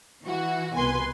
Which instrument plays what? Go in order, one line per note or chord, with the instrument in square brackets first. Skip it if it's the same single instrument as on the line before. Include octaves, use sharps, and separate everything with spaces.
[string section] E3 E4 F#4
C2 B2 B4 G#5 C6